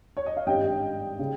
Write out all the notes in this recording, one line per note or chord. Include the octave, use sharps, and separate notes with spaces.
C#5
D#5
F5
G#1 G2 G3 C#4 D#5 G5
C#3